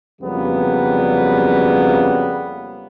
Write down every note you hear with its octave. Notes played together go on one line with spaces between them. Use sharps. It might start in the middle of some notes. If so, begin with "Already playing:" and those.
F2 C#3 F#3 G3 A#3 B3